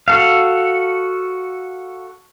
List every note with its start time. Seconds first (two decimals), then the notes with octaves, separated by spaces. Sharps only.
0.08 F#4 A4 F5